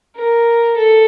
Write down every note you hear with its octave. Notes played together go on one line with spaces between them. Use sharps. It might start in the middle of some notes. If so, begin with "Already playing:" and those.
A#4
A4